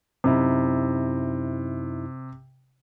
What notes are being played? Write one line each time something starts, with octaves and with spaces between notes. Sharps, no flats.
F#2 C3 D#4 E4